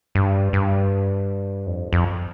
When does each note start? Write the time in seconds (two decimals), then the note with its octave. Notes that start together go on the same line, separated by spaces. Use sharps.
0.15 G2
0.53 G2
1.67 F2
1.93 F2